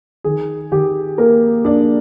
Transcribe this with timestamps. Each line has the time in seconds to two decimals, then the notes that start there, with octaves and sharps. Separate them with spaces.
0.24 D#3 G#4
0.71 D#3 G4
1.18 A#3 A#4
1.65 A#3 D4 D5